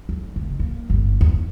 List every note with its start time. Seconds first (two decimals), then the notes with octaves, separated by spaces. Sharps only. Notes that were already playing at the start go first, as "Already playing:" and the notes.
0.09 F2
0.36 F#1
0.59 A#3
0.90 G1
1.21 E2